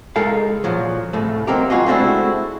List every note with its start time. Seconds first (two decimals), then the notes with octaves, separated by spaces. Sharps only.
0.16 C#2 G#3 D#4 A4 A#4 F5
0.64 A#2 C#3 F3 F#3
1.13 C2 A2 C#3 A3
1.47 F#3 A#3 C4 D#4 G4
1.70 G3 F4 F#4 G#4 D#5
1.86 G#3 A3 C4 D4 E4 F#4